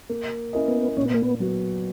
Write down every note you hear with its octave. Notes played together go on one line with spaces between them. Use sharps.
A#3
C#4 E4 A#4 D#5
B3
A#2 C#4
B3
A#3
B3
F#3 B3 F#4